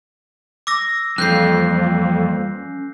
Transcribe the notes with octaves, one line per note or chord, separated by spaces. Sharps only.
D6 E6 A#6
F2 E3 G3 A#3 F#6 G6 C7
C#4